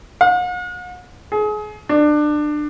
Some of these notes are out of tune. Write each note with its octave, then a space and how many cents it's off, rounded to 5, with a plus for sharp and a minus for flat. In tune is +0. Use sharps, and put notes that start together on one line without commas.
F#5 -45
G#4 +30
D4 +25